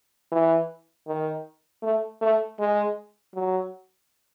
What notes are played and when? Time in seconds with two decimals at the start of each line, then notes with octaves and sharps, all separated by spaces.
0.32 E3
1.08 D#3
1.83 A3
2.22 A3
2.59 G#3
3.35 F#3